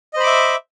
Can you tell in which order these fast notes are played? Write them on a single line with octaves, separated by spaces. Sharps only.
D#5 C5 B5 D6 E5